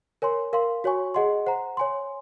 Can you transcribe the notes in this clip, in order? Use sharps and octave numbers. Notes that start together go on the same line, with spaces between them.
A#4 C#5 G#5 C6
A#4 F5 C6
F#4 C#5 G#5 C#6
G#4 D#5 F#5 C6
C5 F#5 A#5
C#5 G#5 C6